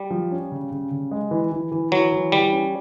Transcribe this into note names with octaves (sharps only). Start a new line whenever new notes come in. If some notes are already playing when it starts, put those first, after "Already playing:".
Already playing: G3
F3
C#4
C#3
C#3
C#3
G#3
E3
E3
E3
E3 F#3
E3
E3 G3
C#4